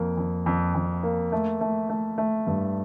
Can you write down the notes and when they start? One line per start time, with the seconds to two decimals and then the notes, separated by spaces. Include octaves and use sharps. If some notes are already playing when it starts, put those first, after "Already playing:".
Already playing: F2 A#3
0.17 F2
0.46 F2
0.75 F2
1.03 A#3
1.32 A3
1.61 A3
1.90 A3
2.18 A3
2.47 G2